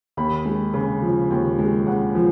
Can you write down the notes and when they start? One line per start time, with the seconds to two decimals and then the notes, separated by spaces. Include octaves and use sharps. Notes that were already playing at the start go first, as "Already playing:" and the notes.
0.17 D#2 B5
0.45 G#3
0.74 C#3
1.02 F3
1.31 D#2
1.59 G#3
1.87 C#3 F#5
2.15 F3